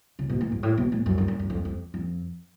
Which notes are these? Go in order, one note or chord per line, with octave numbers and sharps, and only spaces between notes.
C#3
B2
A2
G#2
A2
B2
A2
F#2
F#2
F#2
F#2
F2
F2
F2